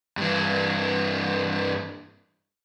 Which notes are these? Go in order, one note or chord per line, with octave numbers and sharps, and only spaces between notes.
G2 E3